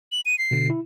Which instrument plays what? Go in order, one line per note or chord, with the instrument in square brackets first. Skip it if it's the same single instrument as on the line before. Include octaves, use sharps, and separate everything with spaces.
[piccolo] F#7
D#7
C7
[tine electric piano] B2 D3
E4